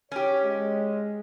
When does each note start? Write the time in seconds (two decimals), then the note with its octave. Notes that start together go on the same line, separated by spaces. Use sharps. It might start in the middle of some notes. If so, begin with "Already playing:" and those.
0.12 C#4 G4 C#5
0.44 G#3